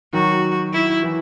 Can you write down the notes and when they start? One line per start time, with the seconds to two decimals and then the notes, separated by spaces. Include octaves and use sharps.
0.13 D#3 F#3 F#4
0.73 E4
1.03 E3